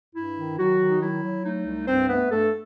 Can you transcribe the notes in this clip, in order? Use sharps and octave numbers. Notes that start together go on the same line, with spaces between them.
G2 E4
D#3
D#3 F#3 F#4
D#3
D#4
F#3 E4
F#3
A3 D#4
C2
G2 C4 C5
A3 B3 B4
G2 A3 A4